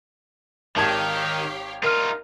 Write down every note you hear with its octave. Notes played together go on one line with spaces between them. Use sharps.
G#1 D#3 G4 C#5 F5 A5 G#6
D#4 F4 A#4 F6